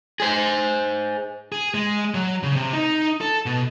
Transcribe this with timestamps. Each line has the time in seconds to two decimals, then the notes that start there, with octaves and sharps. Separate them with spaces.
0.20 G#4 C5
1.52 G#4
1.74 G#3
2.14 F#3
2.43 C#3
2.56 C3
2.73 D#4
3.21 A4
3.46 B2